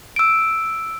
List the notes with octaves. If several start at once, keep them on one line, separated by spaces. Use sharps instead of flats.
E6 D7